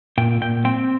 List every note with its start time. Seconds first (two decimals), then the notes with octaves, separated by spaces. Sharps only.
0.18 A#2 G5
0.41 A#2 G5
0.65 C4 G5